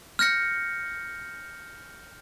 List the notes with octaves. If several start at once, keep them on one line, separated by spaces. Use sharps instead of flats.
F6 G6 A#6 C#7